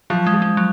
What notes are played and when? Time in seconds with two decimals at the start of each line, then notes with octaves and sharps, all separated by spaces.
0.10 F3 F#3
0.27 G#3
0.34 F3
0.42 G#3
0.57 F#3